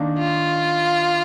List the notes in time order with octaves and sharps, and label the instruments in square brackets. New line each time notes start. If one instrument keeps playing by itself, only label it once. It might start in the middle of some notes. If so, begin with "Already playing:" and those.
Already playing: [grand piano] D#3 A#3 D4
[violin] F4